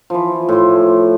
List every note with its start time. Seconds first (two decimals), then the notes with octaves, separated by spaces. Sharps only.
0.10 E3 F3
0.49 A2 C6